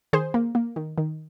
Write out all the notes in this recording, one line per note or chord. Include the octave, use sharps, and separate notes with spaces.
D#3 G#4 C5
A#3
A#3
D#3
D#3